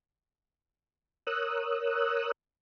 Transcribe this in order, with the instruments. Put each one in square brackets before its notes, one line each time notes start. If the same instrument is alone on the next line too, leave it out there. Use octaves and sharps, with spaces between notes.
[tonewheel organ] A#4 C#5 D#6 E6 F#6